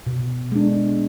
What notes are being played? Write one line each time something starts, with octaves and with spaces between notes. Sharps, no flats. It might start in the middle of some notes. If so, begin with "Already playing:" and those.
B2
G#3 B3 D4